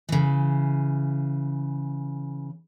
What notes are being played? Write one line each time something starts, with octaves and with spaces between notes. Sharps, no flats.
C#3 E3